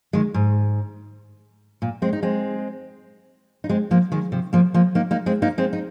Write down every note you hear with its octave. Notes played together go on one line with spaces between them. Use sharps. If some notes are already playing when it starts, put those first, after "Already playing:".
D#3 G#3
G#2
A#2
G#3 C4
D#4
G#3 C4
D#4
G#3 C4
F3 A#3
D#3 G#3
C3 F3
F3 A#3
F3 A#3
A#3 D#4
A#3 D#4
G#3 C4
A#3 D#4
G#3 C4
D#4